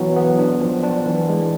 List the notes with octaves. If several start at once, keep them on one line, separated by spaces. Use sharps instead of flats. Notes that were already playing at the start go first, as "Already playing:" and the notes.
Already playing: E3 F#3 B3
B3
D4
F3
D4
E3
G#3